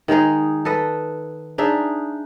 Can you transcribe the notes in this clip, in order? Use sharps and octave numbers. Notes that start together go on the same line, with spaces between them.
D#3 G#3 D#4 G#4
A4 B4 D#5
D4 D#4 G#4 E5